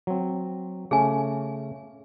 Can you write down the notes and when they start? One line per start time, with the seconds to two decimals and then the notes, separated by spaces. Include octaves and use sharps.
0.07 F#3 C4
0.91 C#3 A3 C#4 G#4 G#5